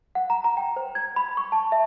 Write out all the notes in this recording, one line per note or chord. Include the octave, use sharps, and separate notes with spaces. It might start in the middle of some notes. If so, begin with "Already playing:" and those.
F#5
A#5
A#5
G5
C5
G#6
B5
C#6
A5
E5